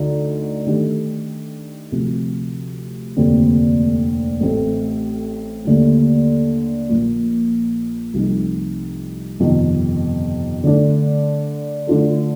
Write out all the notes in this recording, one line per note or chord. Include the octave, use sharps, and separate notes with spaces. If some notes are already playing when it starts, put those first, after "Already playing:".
Already playing: D2 D3 A3 D#4
D#3 A3 D4 G4
D2 C3 F3
F1 D#2 D3 A3 C4
A1 A2 A3 C4
D#2 D3 A3
A#1 A#2 F3 A#3
C2 C3 F3 A3 D#4
G1 F2 C3 D#3
D3 A3 D4
D3 A3 D4 F4 A4